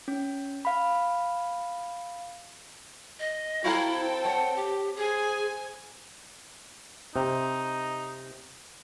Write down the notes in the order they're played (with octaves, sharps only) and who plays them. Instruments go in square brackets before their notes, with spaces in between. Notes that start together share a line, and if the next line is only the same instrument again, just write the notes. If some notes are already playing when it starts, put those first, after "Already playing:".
[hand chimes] C#4
F5 B5
[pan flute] D#5
[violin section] C4 A4 G5 [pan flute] E4 [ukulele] F#4 F5 A#5
[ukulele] C#5 A5 [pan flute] F#5
[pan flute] G4
[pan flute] G#4 [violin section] C5 G#5
[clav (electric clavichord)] C3 [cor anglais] D#4